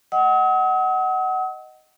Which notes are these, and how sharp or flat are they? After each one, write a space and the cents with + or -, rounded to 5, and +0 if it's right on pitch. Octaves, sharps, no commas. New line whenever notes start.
D#5 +0 F#5 +20 D#6 +45